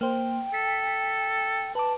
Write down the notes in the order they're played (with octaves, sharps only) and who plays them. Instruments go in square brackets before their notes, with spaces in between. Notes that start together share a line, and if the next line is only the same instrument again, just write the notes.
[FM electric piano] A#3 C5 [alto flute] G5
[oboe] A4 [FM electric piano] B6
[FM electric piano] B4 D6 [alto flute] A5